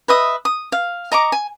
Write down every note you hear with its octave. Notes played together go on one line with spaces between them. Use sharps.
B4 D#5 E5 D#6
D#6
F5
D#5 A#5 C#6 D6
G#5